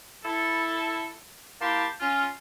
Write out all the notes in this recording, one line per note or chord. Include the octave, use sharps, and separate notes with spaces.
E4 A4
A#3 E4 G4 A5 C6
C#4 F4